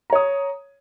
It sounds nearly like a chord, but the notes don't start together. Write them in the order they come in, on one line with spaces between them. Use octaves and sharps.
A#5 C#5 D#6